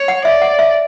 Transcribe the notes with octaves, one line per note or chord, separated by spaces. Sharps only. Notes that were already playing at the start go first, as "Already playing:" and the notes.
Already playing: C#5
F#5
D5 E5
F#5
E5